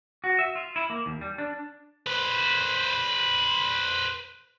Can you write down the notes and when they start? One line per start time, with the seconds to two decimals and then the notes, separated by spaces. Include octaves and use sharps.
0.24 F#4
0.39 E5
0.55 F4
0.76 E4
0.90 A#3
1.06 D#2
1.21 G3
1.38 D4
2.07 B4 C5